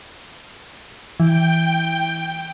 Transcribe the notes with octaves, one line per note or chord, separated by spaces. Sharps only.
E3 G5